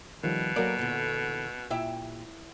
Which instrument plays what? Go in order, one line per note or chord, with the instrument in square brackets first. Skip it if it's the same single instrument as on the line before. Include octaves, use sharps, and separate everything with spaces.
[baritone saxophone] B2 [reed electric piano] D#3 F3 G3
[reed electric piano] F#3 A#3 [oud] A#4 D5
[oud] E2 D3 [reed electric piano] A#2
[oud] A#2 G4 E5 [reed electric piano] E4